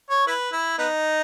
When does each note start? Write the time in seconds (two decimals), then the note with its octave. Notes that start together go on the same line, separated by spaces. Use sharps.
0.10 C#5
0.27 E4 B4
0.53 E4
0.78 B3 D#4